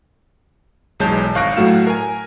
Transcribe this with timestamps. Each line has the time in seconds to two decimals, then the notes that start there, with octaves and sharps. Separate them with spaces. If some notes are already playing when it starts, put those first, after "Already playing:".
1.00 B1 E2 G#3 C#5 A5 G6
1.35 G#1 F5 C#6 F#6 A#6 D7
1.57 A2 F#3 A3 F#4 F5 E7
1.87 A#4 G#5